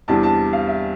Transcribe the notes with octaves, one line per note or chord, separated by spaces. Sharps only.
E2 C3 G3 D4 A5
A5
F5
E5